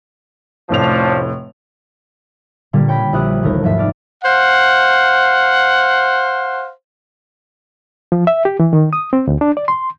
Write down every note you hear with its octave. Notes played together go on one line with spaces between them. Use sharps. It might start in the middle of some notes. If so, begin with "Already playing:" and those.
F1 A2 F3 C#4 D4 F7
A#2 D3 G3 A#3
C#5 G5 B5 A#6
A#1 A#3 E4 G4 D#6 F#6
E1 D#2 A3 A#4 A#6
G#2 F3 A3 E5 E6
F1 D5 F6
C5 F5 F#5
F3
E5
G4
E3
D#3
D#6
C4
D2
D4
D5
C6